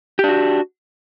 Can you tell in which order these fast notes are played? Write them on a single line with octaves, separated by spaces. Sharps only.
G4 D4 F#4